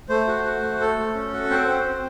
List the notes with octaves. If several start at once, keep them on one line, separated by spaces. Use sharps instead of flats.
A3 C5
F#4
F#4
A3
A3 A4
A3
C#4
F#4
C4 C5
C4
C4